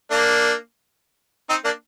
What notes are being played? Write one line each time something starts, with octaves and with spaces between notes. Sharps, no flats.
A#3 D4
C4 D#4
A#3 D4